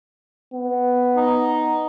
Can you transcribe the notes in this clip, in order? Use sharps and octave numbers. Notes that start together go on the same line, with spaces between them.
B3
D#4